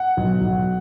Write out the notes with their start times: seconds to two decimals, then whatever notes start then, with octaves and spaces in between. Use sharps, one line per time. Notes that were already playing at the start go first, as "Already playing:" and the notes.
Already playing: F#5
0.17 B1
0.41 B1